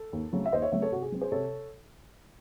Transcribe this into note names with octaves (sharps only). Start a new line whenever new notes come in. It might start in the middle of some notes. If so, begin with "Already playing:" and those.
Already playing: A4
D#2
C#3 F#3 A3 C4
E5
D#2 C5 D#5
C#5 E5
C#3 F#3 A3 C4 C#5 E5
A4 C#5
C3 F#4
G#4
F#3 C4
G#4 C5
C3 A4 C#5